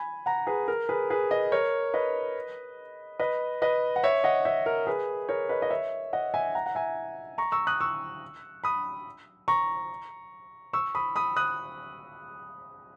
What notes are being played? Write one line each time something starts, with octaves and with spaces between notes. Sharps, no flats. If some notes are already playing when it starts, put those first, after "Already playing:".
Already playing: G#5 B5
F#5 A#5
G#4 B4
A#4
G#4 B4
G#4 B4
B4 D#5
A#4 C#5
B4 D#5
B4 D#5
B4 D#5
F#5
C#5 E5
D#5 F#5
C#5 E5
A#4
G#4 B4
A#4 C#5
B4 D#5
D#5
C#5 E5
D#5 F#5
E5 G#5
F#5 A#5
F#5
E5 G#5
A#5 C#6
C#6 E6
D#6 F#6
C#6 E6
B5 D#6
A#5 C#6
C#6 E6
B5 D#6
B5 D#6
D#6 F#6